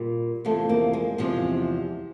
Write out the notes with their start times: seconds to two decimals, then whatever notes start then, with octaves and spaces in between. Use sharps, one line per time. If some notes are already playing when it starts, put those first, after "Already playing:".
Already playing: A#2 G3
0.45 E2 C3 F3 A3
0.69 A#3
0.93 G#3
1.18 E2 C3 F3 G#3